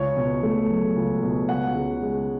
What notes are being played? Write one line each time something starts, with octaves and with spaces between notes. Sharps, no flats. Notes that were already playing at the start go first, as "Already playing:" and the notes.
Already playing: C#2 C#5
B2
A3
F#3
C#2
B2
C#2 F#5
C#3
G#3